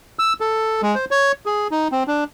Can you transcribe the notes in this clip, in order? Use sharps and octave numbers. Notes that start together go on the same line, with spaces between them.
E6
A4
G#3
C5
C#5
G#4
D#4
C4
D4